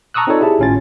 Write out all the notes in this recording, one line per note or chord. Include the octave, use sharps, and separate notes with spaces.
A5 A#5 C#6 D#6 E6 F#6
C4 D#4 F4 A4 C#5 D5
E4 G4 G#4 E5 A5
G#1 A2 C#4 F4 A6